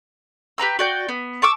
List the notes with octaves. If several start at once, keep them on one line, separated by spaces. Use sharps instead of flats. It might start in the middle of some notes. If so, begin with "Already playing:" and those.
G4 B4 A#5 E6
F#4 D5 G5
B3
A5 C#6 D6 E6